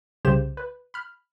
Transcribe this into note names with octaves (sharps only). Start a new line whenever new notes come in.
C2 C#3 G4 C5 E7
B4
B5 F6